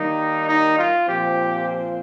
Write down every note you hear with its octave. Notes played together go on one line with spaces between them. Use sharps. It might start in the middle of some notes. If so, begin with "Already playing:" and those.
Already playing: D#3 G3 A#3 D#4
D#4
F4
A#2 F3 C4 G4